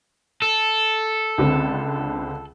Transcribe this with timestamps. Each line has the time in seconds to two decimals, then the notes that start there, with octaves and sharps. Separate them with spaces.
0.42 A4
1.38 C#2 D3 C4